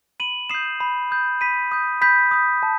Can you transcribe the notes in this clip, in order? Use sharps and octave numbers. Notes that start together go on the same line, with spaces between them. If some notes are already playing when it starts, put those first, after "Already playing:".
B5 D#7 F#7
D#6 G6 C7 E7
B5
D#6 G6
B5 B6 D#7
D#6 G6
B5 G6 B6
D#6 G6
A5